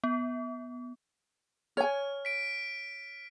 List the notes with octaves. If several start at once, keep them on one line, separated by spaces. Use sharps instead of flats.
B3
C#5 G#5 F6
B6 D7